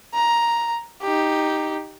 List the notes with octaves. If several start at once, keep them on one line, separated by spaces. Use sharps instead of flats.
A#5
D#4 G4